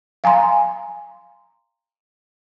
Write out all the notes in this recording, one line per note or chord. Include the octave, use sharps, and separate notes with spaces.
F5 G#5 A#5 C6